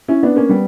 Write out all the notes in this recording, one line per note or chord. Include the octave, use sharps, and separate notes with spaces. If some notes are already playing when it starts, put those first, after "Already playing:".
C#4 E4
B3 D4
A#3 C#4
G3 B3